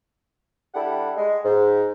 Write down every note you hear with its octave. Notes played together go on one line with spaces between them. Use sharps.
G3 D4 E4 G4 A4 F#5
G#3
G#2